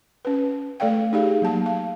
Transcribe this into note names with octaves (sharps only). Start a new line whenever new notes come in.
C#4 B4
A3 A4 D5 F5 G5
D#4 G4 G#4 F5
F#3 A#3 A5
F5